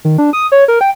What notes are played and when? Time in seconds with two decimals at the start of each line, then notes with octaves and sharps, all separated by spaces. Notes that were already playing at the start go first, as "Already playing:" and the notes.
0.05 D#3
0.18 D4
0.33 D#6
0.52 C#5
0.68 A#4
0.81 G5